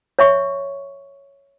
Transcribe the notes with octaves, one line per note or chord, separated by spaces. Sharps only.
C#5 E5 C#6